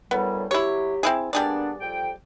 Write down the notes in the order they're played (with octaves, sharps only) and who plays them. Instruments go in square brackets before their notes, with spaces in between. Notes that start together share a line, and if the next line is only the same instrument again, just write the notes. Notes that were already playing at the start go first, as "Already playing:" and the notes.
[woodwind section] F#2 A2 G3 [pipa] B3
[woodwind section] F#3 G4 [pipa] E4 C#5
[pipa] C4 E4 G#4
[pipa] G3 G#4 D5 [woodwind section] A#3 B3 D4
[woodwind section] F2 G5